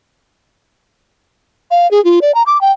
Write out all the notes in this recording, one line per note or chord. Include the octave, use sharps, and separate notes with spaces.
F5
G#4
F4
D5
A#5
D6
G5